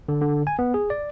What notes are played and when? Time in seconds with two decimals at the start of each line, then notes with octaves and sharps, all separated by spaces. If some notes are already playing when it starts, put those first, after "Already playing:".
0.08 D3
0.22 D3
0.47 G#5
0.59 B3
0.74 G#4
0.90 D5